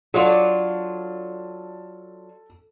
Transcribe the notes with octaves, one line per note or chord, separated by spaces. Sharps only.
F#3 D4 F4 A4